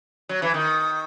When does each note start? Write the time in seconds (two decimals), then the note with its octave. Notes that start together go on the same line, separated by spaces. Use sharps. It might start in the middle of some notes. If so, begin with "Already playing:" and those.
0.29 F#3
0.42 E3
0.54 D#3